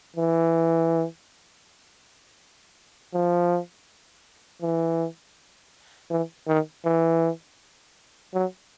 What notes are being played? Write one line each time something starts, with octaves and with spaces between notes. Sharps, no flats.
E3
F3
E3
E3
D#3
E3
F#3